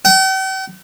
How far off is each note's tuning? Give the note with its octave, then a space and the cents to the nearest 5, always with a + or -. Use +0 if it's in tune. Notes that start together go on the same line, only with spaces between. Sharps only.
G5 -45